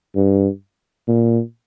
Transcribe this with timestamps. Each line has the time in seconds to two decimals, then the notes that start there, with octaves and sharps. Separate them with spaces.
0.16 G2
1.08 A#2